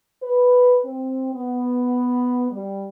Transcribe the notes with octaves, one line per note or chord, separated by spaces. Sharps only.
B4
C4
B3
G3